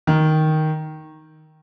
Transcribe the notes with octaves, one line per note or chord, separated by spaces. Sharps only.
D#3